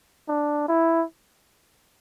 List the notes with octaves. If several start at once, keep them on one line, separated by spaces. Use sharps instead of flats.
D4
E4